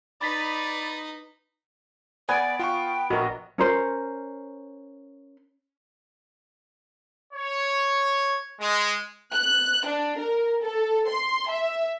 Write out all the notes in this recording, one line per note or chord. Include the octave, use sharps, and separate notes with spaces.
D#4 B4 D5 B5 A6 B6
B3 D5 G#5
F4 G5 C#6
A#1 F#4 A#4 D#5
C#4 A#4 C5
C#5
G#3
F#6
D4
A#4
A4
C6
E5